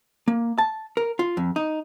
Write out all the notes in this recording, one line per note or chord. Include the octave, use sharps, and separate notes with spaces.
A#3
A5
A#4
F4
F2
D#4